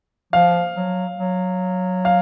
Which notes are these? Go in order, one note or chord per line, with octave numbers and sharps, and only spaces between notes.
F3 F5
F#3
F#3
F5